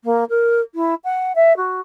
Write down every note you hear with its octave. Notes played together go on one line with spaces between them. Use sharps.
A#3
A#4
E4
F#5
E5
F#4